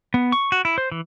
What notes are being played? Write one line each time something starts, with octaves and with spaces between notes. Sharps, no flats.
B3
C#6
F#4
E4
C5
E3